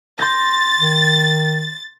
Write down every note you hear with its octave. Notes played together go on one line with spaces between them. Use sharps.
C6 G6 A6 A#6
D#3